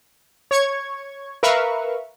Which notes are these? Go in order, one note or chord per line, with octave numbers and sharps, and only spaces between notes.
C#5 C#6 G#6
A#4 B4 E5 F5 C#6